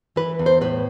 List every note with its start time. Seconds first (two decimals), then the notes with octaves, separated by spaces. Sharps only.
0.16 E3 B4
0.39 E2
0.46 C5
0.61 A2 B4